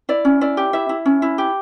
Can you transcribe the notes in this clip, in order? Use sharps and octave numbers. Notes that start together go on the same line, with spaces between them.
E4 D5
C#4
E4 D5
G4
E4 E5
E4
C#4
E4
G4